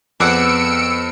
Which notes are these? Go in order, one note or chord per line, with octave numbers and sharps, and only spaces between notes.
F2 B3 G#4 D5 F#5 E6 C#7 D7